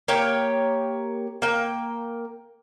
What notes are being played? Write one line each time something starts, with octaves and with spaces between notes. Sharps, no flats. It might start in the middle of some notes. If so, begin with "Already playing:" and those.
A#3 G4 C#5 G5
A#3 G5